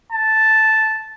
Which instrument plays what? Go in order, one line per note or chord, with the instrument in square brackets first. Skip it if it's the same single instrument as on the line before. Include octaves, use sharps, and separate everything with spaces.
[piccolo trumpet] A5